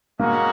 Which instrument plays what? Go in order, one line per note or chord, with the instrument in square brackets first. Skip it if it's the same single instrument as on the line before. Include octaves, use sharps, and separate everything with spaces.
[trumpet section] G#3 C#4 F#4 [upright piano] A#3